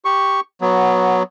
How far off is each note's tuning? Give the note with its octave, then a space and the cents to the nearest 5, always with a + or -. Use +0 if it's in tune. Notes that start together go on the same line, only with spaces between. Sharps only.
G4 +0 C#6 +0
F#3 +0 B3 -10